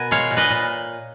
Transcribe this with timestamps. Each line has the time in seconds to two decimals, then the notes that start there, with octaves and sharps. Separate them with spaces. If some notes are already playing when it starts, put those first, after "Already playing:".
Already playing: B2 B3 A#4 G#5
0.11 G#3 C#5 F5
0.31 A#2
0.37 B4 D#5
0.50 A#2